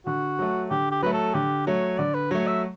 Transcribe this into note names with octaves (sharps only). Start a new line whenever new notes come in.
D3 F#4
F#3 A3
D3 G4
G4
F#3 A3 B4
A4
D3 G4
F#3 A3 C#5
D3 D5
B4
F#3 A3 C#5
E5